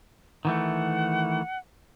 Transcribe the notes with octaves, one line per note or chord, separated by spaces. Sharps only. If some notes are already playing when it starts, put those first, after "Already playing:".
D#3 E3 A3 F#5